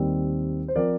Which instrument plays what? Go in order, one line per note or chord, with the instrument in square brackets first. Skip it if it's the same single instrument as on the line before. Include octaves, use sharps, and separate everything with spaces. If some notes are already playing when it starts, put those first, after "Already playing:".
Already playing: [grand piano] D#2 D#3 G3 C4 D#4
C5
F3 C4 A#4 D5